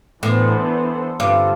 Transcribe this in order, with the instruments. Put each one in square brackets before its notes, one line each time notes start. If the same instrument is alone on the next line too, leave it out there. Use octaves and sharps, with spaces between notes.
[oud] A2 [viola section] E3 B3 D4 A4 C5
[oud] G2 [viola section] D3 G3 C4 F4 A4